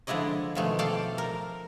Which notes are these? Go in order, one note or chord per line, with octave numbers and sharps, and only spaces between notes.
D3 F3 G#3 E4 D5 D#5
B2 D#3 F3 G#3 A3
A4 D5 F5 G5 A5
A#4